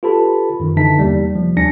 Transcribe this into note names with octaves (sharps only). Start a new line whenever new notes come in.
F4 G4 A4 B4 A5 B5
F#2 D#3
D3 E3 D#4 E5 A5 B6
E2 C3 G3 A#3
F3
D#2 G3 D4 G#5 A#6 C#7